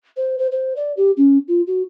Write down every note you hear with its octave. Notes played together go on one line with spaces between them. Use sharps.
C5
C5
C5
D5
G4
C#4
F4
F#4